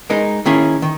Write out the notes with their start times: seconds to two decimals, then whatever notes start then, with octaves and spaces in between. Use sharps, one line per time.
0.10 G#3 D#4 A#4
0.46 D#3 A#3 C#4 E4 G#4
0.82 D#3